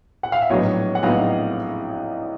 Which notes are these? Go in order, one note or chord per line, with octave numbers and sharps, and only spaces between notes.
F#5
F5
E5
A#1 A2 F#3 B3 D#4 C#5 D#5
F#5
A#1 A2 F#3 B3 D#4 D#5 F5